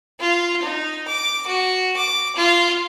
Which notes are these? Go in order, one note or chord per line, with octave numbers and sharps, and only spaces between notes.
F4
D#4
D6
F#4
D6
F4